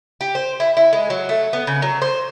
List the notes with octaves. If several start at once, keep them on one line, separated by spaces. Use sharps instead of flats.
G4
C5
E4
E4
G#3
F#3
A3
B3
C#3
F#3
C5